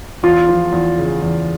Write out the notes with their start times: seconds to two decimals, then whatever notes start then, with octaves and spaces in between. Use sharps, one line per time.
0.23 E2 F4
0.49 F3
0.72 E2
0.98 C#3
1.22 E2